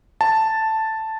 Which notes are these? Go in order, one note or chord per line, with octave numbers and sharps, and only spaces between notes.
A5